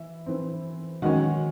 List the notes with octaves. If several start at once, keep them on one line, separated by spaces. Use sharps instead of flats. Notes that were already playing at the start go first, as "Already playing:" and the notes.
Already playing: E3 E5
E3 C4
D#3 G#3 C#4 F#4 F#5